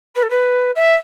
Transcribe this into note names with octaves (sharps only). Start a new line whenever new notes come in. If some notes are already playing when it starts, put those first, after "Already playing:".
B4
A4
B4
E5